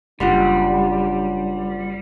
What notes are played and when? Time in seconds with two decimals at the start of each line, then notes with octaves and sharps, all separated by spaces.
0.20 F#1 G3 D4 F4 F#5 C6